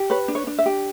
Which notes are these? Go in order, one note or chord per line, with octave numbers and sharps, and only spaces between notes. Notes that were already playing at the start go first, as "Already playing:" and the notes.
Already playing: G4
B4 C#5
D4
C#5
D4
E5
G4